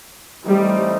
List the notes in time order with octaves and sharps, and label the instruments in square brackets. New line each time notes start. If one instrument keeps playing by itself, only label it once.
[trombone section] A2 E3 A3 C4 D#4 [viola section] G3